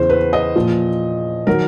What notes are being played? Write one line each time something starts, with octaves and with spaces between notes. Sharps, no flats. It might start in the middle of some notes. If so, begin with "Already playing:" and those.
Already playing: E2 C#3 E3 C5
B4
D#5
A#2 F3
D#3 F#3 A#4